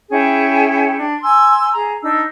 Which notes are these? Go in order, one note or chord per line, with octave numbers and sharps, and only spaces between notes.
C#4 E4 G#4 G5
D4
G#5 C6 E6
G#4 A#5
D4 D#4 E6